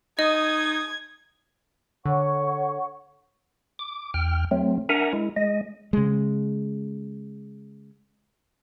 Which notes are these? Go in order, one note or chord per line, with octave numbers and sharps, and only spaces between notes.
D#4 D#5 D#6 G#6
D3 C#5 F#5 C#6
D6
E2 G5 F6
F#3 A3 C4
D4 A#4 E5 F#5 G#5 A#5
G#3 E4
G#3 D#5
C#3 G#3